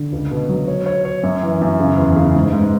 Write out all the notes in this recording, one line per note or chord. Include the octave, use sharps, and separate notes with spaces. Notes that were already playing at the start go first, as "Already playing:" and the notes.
Already playing: D3
C#2
B2
F#3
C#5
C#5
C#5
F#2
E3
F#2
C#3
E2
C#3
G#2
G#2